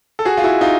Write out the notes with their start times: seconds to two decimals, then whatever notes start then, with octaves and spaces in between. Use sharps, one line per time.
0.19 A4
0.25 F#4 G#4
0.37 F4
0.44 E4 F#4
0.61 D#4 F4